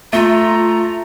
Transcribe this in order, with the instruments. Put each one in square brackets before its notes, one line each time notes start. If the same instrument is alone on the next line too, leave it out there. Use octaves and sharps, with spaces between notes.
[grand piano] A3 [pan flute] F4 [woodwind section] A#5